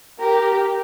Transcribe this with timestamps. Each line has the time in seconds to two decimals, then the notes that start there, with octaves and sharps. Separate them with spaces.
0.21 G4 A#4